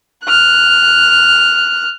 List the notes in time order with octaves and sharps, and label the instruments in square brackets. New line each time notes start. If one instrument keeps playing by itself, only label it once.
[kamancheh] F6 F#6